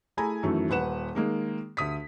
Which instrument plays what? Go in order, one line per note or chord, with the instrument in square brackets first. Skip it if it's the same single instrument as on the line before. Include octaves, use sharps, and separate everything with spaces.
[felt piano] A3 E4 G#4 G#5 A#5 B5
F#2 D#3 E3 F#3 A3
D#1 B4 F#5 E7
D#3 G#3 A#3
D2 D#6 B6